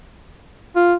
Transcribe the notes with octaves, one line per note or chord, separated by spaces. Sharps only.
F4